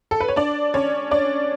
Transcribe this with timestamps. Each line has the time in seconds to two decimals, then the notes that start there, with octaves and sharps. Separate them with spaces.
0.11 A4
0.20 B4
0.28 C#5
0.36 D4 D5
0.74 C#4 C#5
1.11 D4 D5